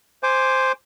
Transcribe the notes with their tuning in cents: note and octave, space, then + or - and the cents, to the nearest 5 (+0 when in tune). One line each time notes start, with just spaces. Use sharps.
C5 +0 G#5 -5 D6 +0